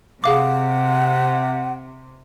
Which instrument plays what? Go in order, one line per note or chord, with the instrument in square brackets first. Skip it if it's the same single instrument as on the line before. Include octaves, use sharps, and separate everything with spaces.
[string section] C3 [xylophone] G#4 F5 D6 [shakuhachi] F#5